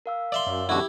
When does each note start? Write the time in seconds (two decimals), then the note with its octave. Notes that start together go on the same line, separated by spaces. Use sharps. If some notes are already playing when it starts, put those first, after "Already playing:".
0.06 A#4 F5 E6
0.32 D5 E5 C6
0.47 F#2
0.69 B2 D3 E4 F#4 G4